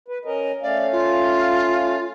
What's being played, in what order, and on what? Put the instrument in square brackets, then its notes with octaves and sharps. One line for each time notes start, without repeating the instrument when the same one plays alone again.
[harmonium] B4
C#4 A#4 D#5
[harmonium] A3 C#4 F5 [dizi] D5
[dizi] F4